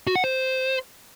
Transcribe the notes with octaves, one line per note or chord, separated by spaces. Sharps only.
F#4
F#5
C5